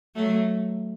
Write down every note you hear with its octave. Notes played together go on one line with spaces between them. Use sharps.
F#3 A3